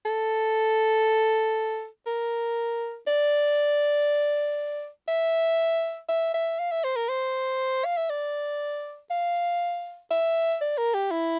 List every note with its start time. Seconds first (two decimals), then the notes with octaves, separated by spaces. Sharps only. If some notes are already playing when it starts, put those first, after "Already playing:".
0.06 A4
2.07 A#4
3.07 D5
5.08 E5
6.09 E5
6.34 E5
6.59 F5
6.72 E5
6.84 C5
6.96 A#4
7.09 C5
7.85 F5
7.97 E5
8.09 D5
9.10 F5
10.10 E5
10.61 D5
10.78 A#4
10.94 G4
11.11 E4